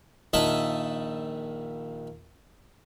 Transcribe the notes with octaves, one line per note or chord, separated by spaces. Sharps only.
A#1 D#3 D#5 E5 A5 B5